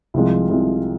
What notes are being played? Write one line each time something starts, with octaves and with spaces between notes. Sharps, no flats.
C2 C3 F3 G#3
C2 C3 F3 G#3